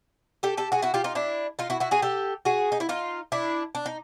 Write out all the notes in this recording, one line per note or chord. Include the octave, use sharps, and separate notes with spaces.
G4 A4
G4 A4
F#4 G#4
E4 F#4
F4 G4
D#4 F4
D4 E4
D#4 F4
E4 F#4
E4 F#4
F#4 G#4
G4 A4
F#4 G#4
D#4
E4
D#4 F4
D4 E4
D4
D#4